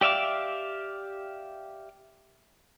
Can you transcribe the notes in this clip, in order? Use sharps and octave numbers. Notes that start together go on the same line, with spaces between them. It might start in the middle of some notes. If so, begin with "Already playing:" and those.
G4 D5 E5 F5 D6